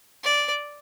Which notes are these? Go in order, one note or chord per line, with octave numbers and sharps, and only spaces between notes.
D5